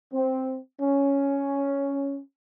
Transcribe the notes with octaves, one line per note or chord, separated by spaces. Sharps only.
C4
C#4